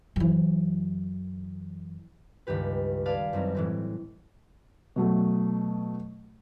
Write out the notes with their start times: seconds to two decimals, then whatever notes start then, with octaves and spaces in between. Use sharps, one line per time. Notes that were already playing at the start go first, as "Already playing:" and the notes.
0.16 F#2 E3
2.47 C#2 G2 D#3 G4 B4
3.05 G#4 B4 D5 F5 A5
3.33 F#2 G3 C4 D#4
3.55 A2 E3 C4
4.96 B2 F#3 A3